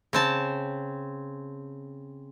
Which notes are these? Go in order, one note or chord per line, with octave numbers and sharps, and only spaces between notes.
C#3 C4 A5